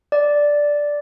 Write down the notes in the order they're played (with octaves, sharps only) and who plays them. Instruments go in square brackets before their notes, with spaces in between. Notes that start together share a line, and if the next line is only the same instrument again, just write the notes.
[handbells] D5